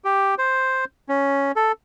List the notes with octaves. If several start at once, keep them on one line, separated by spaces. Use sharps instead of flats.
G4
C5
C#4
A4